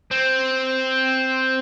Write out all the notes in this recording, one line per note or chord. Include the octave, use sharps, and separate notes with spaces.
C4